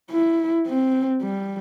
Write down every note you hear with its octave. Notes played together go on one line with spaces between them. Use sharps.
E4
C4
G3